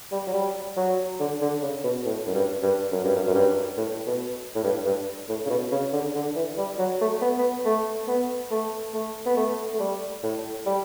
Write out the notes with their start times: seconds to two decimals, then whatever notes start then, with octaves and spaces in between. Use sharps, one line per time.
0.12 G3
0.27 F#3
0.34 G3
0.77 F#3
1.20 D3
1.41 D3
1.62 C#3
1.84 B2
2.06 A2
2.27 F#2
2.34 G2
2.63 G2
2.92 F#2
3.04 G2
3.16 F#2
3.27 F#2
3.35 G2
3.77 A2
4.07 B2
4.55 A2
4.64 G2
4.85 G2
5.29 A2
5.46 C#3
5.50 B2
5.71 C#3
5.93 D3
6.15 D3
6.36 E3
6.58 G3
6.79 F#3
7.01 A3
7.21 B3
7.38 B3
7.65 A3
8.08 B3
8.51 A3
8.94 A3
9.26 B3
9.37 A3
9.73 A3
9.80 G3
10.23 A2
10.66 G3